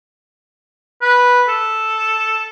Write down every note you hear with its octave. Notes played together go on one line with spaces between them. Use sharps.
B4
A4